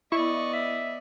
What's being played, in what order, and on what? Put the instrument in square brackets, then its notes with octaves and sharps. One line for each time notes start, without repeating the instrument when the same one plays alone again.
[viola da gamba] B3 D5 D#5 [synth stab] E4 [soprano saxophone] C#6
[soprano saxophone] E5